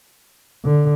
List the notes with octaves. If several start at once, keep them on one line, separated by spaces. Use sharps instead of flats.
D3